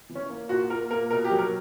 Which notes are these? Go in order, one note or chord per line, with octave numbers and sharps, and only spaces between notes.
E3
C#4
A#3
A#2 F#4
A#2 A#4
A#3 A#4
B2 A#4
G4
F#3
A#4